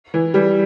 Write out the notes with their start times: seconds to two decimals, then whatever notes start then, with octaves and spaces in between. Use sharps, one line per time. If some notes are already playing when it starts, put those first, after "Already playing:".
0.14 E3
0.34 E3 G3